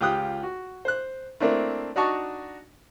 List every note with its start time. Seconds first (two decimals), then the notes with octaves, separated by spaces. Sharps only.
0.01 C#2 F4 G4 G5 D#6 F#6
0.43 F#4
0.85 C5 F#6
1.40 A3 A#3 C4 D4 E4 A#4
1.96 D4 D#4 F#4 A5 C#6